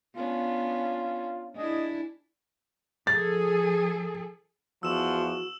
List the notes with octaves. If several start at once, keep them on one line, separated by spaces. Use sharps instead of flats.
B3 C#4 D4 F4
D4 E4 G#4 D#5
F3 G#4 A4 A6
E2 F3 F#4 E6 E7 F#7